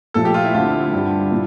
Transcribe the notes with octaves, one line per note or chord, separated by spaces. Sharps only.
A#2 F3 A3 A4
G4
F4
E4
D2 D3 A3 C4 F4
G2 D3 G3 D4
A#2 E4